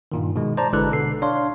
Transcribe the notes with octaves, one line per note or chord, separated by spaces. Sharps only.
G2 A#2 D#3
B2 D#3 G#3
C5 D5 A5 A#5
G#1 D3 G#3 E4 B4 F#6
B2 D3 C7
D4 C#5 D5 F5 C6